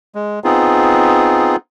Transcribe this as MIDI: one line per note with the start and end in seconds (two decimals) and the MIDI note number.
0.15 0.39 56
0.44 1.56 59
0.44 1.56 60
0.44 1.56 63
0.44 1.56 65
0.44 1.56 68